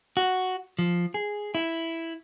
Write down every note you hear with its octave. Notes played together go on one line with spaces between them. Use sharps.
F#4
F3
G#4
E4